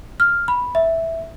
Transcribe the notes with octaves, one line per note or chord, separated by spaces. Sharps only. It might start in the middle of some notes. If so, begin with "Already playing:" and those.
F6
B5
E5